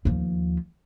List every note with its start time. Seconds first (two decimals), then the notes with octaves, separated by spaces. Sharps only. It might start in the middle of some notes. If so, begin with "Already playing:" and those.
0.05 D#2 F3